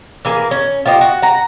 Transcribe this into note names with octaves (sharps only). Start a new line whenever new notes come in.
E3 A#3 G#4
C#4
F4 G4 C5 D#5
F#4
F#5 A#5